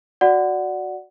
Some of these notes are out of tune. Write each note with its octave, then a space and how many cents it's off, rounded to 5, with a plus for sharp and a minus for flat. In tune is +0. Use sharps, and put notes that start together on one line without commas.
F#4 -10 D5 +0 F#5 +0